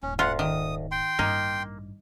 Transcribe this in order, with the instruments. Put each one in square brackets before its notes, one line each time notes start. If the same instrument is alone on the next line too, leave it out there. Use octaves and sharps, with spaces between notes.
[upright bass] D#1 G#2 [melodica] C#4
[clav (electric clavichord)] D2 [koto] F4 [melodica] F#5
[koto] D#3 [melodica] D#6
[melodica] G5 C6
[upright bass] A1 G2 [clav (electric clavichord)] A#3 [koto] D#4